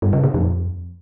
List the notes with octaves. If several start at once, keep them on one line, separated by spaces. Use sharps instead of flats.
G2
C#3
A#2
F2